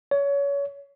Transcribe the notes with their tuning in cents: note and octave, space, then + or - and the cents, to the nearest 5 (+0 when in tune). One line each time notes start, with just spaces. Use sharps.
C#5 +25